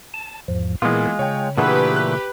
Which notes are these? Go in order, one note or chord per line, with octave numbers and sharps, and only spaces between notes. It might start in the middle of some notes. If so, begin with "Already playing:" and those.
A5
E2 G#2 F3
A#2 E3 G#3 A#3 B3 F4 G#4 A#4
C#3 C#5 G5
A#2 E3 A3 D4 G4 G#4 B4 F#5
F#6